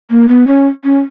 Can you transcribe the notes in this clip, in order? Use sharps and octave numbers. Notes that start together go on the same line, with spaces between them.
A#3
B3
C#4
C#4